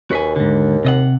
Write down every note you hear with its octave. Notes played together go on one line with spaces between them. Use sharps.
D#2 F#4 B4 G#5
G#2 D3
C3 D#5 F#5